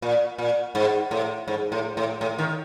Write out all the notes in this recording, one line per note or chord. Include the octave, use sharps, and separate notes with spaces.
A#2
A#2
G#2
A2
G#2
A2
A2
A2
D#3